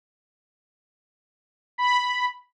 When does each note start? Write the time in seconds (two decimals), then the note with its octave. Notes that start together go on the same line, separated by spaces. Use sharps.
1.78 B5